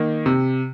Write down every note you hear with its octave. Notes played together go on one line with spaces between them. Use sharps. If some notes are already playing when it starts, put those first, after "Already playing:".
Already playing: D#3 A#3
C3